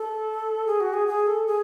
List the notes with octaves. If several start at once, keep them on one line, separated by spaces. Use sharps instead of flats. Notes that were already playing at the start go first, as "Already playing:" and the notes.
Already playing: A4
G#4
F#4
G#4
G#4
A4
G#4